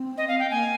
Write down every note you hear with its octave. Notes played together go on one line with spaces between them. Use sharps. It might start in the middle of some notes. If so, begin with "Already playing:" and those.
Already playing: C4
D#5
F5
G5
A#3 G#5